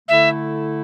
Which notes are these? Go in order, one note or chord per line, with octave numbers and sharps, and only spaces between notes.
D3 A3 E4 A4 E5